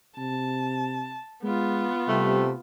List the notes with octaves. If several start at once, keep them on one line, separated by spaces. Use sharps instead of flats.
C3 A5
G#3 B3 F4
C3 G3 A3